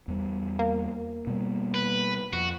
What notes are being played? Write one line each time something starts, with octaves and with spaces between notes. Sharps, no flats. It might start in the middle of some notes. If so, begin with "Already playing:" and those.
E2 G3
A#3
B2 G3
B4
F2 F#4